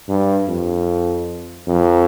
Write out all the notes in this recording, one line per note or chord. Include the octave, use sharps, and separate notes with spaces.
G2
F2
F2